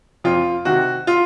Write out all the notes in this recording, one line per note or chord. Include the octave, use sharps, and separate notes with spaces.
F2 F4
C3 D#3 F#4
F4